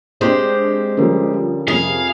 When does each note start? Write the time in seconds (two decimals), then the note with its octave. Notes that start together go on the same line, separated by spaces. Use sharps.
0.21 G#3 C4 D4 G4 C5
0.97 D3 F3 G3 C#4 A#4
1.68 F2 C3 G#4 F5